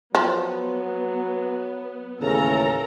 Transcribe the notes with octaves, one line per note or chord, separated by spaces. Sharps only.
F3 F#3 B3
D#2 A2 C#3 E3 A4 A#4 A#5